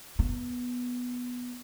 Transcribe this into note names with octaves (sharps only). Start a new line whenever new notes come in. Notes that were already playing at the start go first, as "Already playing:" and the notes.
B3